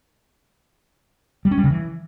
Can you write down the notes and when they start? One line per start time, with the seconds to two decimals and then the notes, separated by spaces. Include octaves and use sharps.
1.45 G3
1.51 C#4
1.58 G3
1.64 C#3
1.70 E3